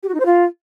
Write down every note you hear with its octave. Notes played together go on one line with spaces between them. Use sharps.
G4
F#4
D#4
C5
F4